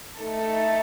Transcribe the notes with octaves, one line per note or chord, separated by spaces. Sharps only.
A3 D#4 A4